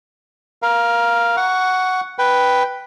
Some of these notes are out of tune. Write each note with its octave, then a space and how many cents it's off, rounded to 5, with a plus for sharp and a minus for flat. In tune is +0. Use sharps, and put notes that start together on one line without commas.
A#4 +25 F5 +0
F#5 +0 C#6 +15
B4 +0 G5 +0